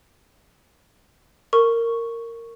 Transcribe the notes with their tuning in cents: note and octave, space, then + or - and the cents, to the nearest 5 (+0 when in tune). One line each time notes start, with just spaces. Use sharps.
A#4 -15 C#6 +0